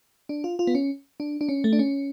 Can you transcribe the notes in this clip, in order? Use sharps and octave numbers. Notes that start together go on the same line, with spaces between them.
D4
F4
F4
B3
C#4
D4
D4
C#4
A3
D4
C#4